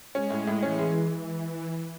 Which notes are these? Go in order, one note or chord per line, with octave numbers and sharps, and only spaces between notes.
G#3 C#4
A2
A2
E3 C#4
G#3